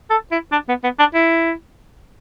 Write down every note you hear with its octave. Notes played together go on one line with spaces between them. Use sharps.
A4
E4
D4
B3
B3
D4
E4